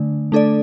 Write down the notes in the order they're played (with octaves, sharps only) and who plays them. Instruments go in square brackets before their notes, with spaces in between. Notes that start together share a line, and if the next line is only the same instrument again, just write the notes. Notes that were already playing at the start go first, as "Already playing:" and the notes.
Already playing: [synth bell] D3 A3 D4
A3 D4 A4 D5